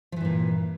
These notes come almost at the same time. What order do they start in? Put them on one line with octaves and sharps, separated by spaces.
F3 E3 G2 A#2